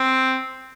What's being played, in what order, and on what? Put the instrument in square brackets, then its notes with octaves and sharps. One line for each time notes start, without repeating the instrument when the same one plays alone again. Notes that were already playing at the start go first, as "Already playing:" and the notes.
Already playing: [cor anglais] C4